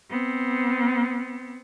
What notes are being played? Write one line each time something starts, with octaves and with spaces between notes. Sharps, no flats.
B3 C4